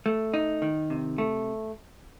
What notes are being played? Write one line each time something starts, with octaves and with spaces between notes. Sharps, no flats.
A3
D#4
D#3
C3
A3